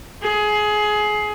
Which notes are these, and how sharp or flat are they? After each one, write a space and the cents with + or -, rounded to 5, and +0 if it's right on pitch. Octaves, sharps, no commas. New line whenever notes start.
G#4 +20